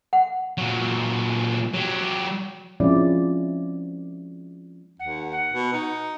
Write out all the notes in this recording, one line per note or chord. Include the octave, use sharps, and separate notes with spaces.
F#5
A#2 F#3
F#3 G4
F3 G#3 C4 C#4 E4 D5
D#2 F#5
F#5
B2
D#4